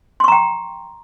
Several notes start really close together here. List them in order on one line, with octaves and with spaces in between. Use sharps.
C6 C#6 A#5 G5